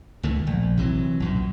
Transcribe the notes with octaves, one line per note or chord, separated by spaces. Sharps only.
C#2 D#3 A3
A#1
C3 E3 F#3
B1 F#2 A#2